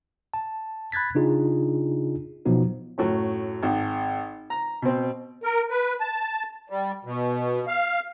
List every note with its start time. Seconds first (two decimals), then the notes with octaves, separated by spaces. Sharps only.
0.34 A5
0.92 B5 F#6 G#6 A6 B6
1.15 C#3 D4 D#4 F4 G#4
2.45 B2 F3 F#3 B3 D#4 F#4
2.98 F#2 A2 F#3
3.63 G#1
4.50 A#5
4.82 B2 C4
5.43 A#4
5.70 B4
6.00 A5
6.70 G3
7.05 B2
7.67 F5